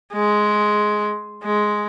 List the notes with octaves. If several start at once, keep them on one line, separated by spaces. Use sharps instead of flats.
G#3
G#3